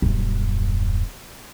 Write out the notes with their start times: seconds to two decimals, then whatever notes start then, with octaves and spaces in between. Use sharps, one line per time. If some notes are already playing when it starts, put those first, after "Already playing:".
0.02 D#1 F#2